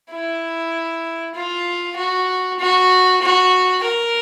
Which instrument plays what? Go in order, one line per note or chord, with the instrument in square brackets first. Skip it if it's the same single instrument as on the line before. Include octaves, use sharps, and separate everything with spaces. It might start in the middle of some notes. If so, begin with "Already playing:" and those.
[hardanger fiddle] E4
F4
F#4
F#4
F#4
A#4